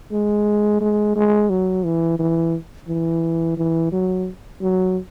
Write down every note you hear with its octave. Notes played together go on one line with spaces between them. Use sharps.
G#3
G#3
G#3
F#3
E3
E3
E3
E3
F#3
F#3